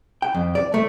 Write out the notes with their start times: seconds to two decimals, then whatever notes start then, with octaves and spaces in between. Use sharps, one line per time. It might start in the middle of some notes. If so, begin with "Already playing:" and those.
0.22 G5
0.34 F2
0.55 D5
0.74 A3